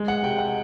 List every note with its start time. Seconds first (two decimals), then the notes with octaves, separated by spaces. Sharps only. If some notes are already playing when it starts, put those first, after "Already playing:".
Already playing: G#3
0.08 F#5
0.23 C3 G5
0.38 F#5